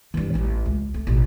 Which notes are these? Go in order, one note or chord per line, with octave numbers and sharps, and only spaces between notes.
G2 E3
A1 C#4
C#2
A3
A1 B2